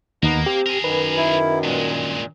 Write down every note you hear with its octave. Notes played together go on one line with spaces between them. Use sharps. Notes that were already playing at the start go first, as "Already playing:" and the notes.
D#2 A#3 B3 D#4
C4 G4
G#4 A#4
F#2 D#3 B4
E4
G2 A#2 G#3